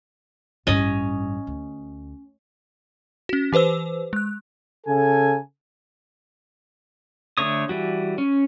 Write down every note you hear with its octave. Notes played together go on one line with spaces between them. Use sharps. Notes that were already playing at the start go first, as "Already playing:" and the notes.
A1 G2 C#4 D#5
D2
C#4 F#4
E3 G4 B4 C5 E6
G#3 F#6
C#3 A4 G#5
D3 A3 C#5 D#6
E3 G3 F#4
C#4